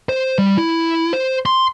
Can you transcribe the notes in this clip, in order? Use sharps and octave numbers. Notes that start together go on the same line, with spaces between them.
C5
G3
E4
C5
C6